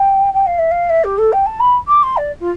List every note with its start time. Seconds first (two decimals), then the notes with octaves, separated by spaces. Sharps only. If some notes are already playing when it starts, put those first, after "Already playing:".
Already playing: G5
0.33 G5
0.46 F5
0.58 E5
0.71 F5
0.89 E5
1.04 G4
1.18 A4
1.32 G5
1.46 A5
1.60 B5
1.87 D6
2.03 C6
2.17 D5
2.39 F4